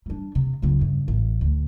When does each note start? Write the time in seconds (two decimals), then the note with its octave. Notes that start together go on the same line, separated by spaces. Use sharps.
0.06 G3 D4
0.35 C3
0.62 C#2 F#2
0.81 G2 C#3
1.08 A1
1.41 D2